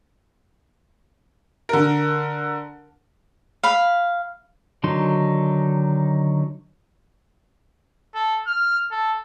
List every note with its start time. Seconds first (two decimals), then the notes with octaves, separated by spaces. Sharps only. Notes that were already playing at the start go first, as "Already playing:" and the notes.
1.69 D3 A#4
3.63 F5 B5
4.84 D3 D#3 F#3 D#4 C6
8.14 A4
8.47 F6
8.92 A4